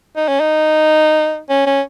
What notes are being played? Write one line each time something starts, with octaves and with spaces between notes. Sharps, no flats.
D#4
C#4
D#4
C#4
C#4